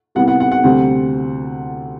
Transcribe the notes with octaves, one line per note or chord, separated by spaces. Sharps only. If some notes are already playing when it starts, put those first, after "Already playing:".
C2 C3 G3 B3 E4 F#5
F#5
F#5
F#5
D2 C3 G3 C4